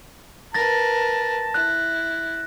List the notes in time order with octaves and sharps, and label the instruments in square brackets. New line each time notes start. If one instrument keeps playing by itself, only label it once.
[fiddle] A#4 B4 [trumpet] A5 [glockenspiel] A6 A#6
[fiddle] E4 [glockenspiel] F#6